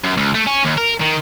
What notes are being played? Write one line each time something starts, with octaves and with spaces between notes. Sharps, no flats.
F#2
C#2
A3
C#4
D#2
A#4
D#3